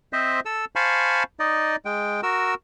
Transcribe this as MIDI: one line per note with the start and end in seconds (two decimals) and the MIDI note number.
0.13 0.40 60
0.13 0.40 72
0.13 0.40 75
0.13 0.40 76
0.45 0.65 69
0.45 0.65 88
0.76 1.23 72
0.76 1.23 77
0.76 1.23 80
0.76 1.23 81
0.76 1.23 83
0.76 1.23 85
1.40 1.76 63
1.40 1.76 74
1.40 1.76 75
1.85 2.21 56
1.85 2.21 79
2.23 2.54 66
2.23 2.54 70
2.23 2.54 88